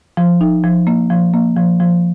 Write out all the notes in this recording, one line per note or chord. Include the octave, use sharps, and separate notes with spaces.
F3
D#4
F3
A#3
F3
A#3
F3
F3